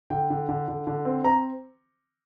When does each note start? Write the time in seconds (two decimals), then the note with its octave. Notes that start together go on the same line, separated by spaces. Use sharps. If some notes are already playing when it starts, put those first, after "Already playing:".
0.10 D3 G5
0.30 D3
0.49 D3
0.68 D3
0.87 D3
1.05 C4
1.24 C4 A#5